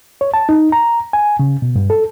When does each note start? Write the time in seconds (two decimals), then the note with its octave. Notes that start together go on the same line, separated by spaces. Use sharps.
0.21 C#5
0.34 A5
0.49 D#4
0.72 A#5
1.13 G#5
1.39 C#3
1.62 B2
1.76 G2
1.90 A4